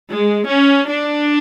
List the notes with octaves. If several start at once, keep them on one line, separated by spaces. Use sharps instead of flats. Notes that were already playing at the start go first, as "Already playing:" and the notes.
G#3
C#4
D4